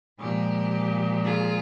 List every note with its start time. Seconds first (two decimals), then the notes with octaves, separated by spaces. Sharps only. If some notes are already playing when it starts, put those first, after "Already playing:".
0.20 A#2 F3 G#3 G4
1.25 F4 G#4